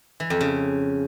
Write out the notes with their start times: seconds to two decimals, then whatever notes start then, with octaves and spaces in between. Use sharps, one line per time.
0.20 E3
0.30 F2
0.41 C#3